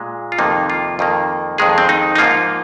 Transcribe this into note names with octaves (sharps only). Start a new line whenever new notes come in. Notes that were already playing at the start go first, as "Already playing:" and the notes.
Already playing: A#2 G#3
F4
F2 C3 D#3 A#3 D#4
F4
F2 D#3 A#3
F2 D#3 G#3 G#4
C4
D#4
D#4
G#2 F3 A#3 F4